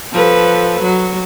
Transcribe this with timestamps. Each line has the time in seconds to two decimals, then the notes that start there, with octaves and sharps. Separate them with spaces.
0.12 F3 A4 B4
0.81 F#3